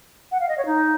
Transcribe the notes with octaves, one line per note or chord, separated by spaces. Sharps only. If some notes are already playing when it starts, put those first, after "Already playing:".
F#5
F5
D#5
C#5
D#4